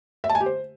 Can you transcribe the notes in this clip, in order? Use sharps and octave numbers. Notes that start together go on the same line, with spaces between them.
E5
A5
G#5
G4
C5